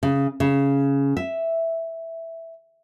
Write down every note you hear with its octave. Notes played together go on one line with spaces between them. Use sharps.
C#3
C#3
E5